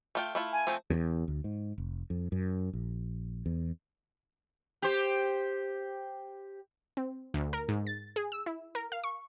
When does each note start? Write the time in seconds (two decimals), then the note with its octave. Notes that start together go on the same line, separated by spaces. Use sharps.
0.15 A3 F4 G5
0.35 A3 E4 F4
0.52 G#5
0.67 F3 A3 C4
0.90 E2
1.28 D2
1.44 G#2
1.78 F1
2.10 F2
2.32 F#2
2.73 A#1
3.46 E2
4.82 G4 C5
6.97 C4
7.34 D2
7.53 A#4
7.69 G#2
7.87 A6
8.16 G#4
8.32 E6
8.46 E4
8.75 A#4
8.92 F5
9.04 C#6